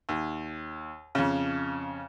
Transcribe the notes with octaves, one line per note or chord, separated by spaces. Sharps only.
D#2
F2 C#3